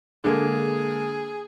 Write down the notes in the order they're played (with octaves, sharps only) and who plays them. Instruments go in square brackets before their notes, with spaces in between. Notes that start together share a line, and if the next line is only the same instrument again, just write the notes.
[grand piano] D3 G#3 A#3 [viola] G#4